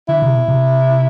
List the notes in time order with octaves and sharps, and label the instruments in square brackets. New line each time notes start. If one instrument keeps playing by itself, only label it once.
[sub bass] D3 [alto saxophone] E4
[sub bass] C3
B2
C3